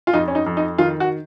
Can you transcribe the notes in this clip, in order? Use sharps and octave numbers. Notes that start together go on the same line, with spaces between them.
F4
F2 D#4
C#4
D#4
F2
D#4
D#3 F4
F#4